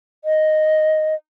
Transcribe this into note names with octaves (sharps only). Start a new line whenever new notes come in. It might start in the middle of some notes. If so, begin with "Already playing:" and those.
D#5